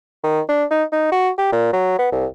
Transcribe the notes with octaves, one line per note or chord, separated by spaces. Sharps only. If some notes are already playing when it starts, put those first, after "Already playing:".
D#3
D4
D#4
D#4
F#4
G4
A#2
F#3
B3
C2